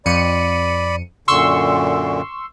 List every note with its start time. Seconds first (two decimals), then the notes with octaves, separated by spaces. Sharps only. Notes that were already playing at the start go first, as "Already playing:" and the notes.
0.06 F2 D5 B5 C#7 D#7
1.28 F#2 A#2 D3 C6 C#6 E6